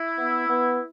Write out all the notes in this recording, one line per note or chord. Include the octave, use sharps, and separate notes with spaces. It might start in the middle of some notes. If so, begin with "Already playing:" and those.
Already playing: E4
B3
B3